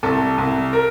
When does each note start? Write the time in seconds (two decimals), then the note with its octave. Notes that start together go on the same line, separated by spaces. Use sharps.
0.03 C2 A4
0.38 C2
0.73 A#4